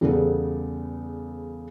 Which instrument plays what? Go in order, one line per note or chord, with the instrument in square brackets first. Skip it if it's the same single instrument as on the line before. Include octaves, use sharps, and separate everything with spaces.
[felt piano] E2 C#3 G3 B3 A4